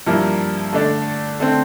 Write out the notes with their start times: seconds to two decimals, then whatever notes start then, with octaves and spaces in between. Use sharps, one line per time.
0.07 G2 F3 A#3 E4
0.73 D3 A3 D4
1.40 D3 A3 C4